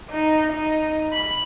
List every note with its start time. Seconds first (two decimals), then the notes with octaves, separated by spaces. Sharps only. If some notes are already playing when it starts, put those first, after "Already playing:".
0.10 D#4
0.52 D#4
1.13 B5